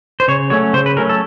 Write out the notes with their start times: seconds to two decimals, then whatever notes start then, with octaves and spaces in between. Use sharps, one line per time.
0.20 C5
0.28 C#3 C#5
0.50 F#3 A3 C#4 C#5
0.73 C#3 C5
0.86 B4
0.97 F#3 A3 C#4 A#4
1.09 A4